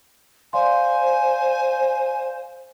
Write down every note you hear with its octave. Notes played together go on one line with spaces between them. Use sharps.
C5 D5 F5 G#5 C6